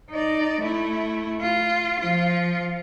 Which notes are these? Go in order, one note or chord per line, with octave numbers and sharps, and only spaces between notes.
D#4 D5
A3 E4
F4
F3 F4